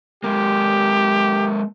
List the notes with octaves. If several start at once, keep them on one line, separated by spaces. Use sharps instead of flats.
G#3 A#3 G4